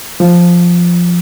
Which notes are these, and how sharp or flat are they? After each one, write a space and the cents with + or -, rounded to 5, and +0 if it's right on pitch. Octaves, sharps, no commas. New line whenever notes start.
F3 +0